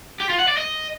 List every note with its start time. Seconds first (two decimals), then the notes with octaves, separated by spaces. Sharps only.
0.20 G4
0.29 F4
0.39 F#5
0.48 D5
0.57 D#5